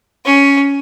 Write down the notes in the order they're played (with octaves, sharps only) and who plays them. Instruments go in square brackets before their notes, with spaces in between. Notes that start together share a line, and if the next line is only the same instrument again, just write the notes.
[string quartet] C#4